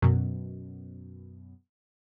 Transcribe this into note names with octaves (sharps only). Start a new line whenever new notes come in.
F#2 B2